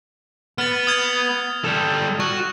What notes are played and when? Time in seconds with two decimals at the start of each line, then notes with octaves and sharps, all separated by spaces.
0.58 B3 F6 A6
0.87 D#6 F6 G#6
1.65 G3 A4
2.20 F#4 C#6